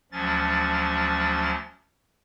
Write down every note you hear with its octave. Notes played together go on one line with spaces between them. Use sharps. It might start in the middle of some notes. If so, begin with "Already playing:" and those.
D2 F3 F#3 C#4 A6